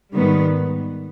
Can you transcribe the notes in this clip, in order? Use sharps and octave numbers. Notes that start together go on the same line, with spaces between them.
G#2 D#3 G3 B3